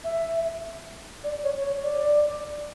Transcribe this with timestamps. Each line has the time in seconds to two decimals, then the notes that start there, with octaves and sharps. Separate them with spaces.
0.04 E5
1.24 D5
1.44 C#5
1.64 C#5
1.83 D5